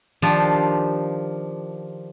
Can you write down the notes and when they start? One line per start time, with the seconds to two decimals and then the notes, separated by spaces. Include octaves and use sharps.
0.22 D#3 F3 D4 F4 G4